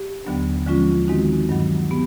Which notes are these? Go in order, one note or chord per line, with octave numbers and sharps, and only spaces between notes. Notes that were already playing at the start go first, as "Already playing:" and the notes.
Already playing: G4
D#2 D3 F#3 B3 D4
D3 F3 G#3 C#4 F4
D#3 G#3 C4 D#4 F#4
G2 D#3 F#3
B3 G4